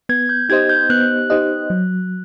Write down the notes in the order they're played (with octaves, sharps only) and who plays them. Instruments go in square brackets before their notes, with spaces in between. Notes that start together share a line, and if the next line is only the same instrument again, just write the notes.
[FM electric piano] B3 [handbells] G#6
[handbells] G6
[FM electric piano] D#4 G4 C5 D#5 [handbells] G#6
[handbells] G6
[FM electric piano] B3 [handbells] F#6
[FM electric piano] D#4 G4 C5 D#5
F#3